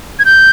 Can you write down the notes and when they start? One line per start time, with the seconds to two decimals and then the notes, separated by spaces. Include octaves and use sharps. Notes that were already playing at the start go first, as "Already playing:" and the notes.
0.19 G#6
0.25 G6